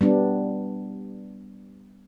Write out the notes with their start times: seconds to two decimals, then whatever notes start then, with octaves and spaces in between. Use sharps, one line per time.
0.01 G3 B3 D4